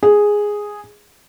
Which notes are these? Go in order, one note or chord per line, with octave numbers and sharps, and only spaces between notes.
G#4